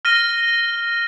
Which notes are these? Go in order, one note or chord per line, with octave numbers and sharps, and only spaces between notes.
F6 A#6 D#7 G7